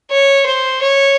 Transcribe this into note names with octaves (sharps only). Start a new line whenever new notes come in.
C#5
C5
C#5